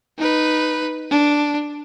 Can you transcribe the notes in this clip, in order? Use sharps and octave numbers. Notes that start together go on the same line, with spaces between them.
D#4 B4
D4